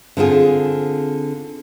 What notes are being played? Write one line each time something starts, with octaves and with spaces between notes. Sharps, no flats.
D3 C4 F4 G#4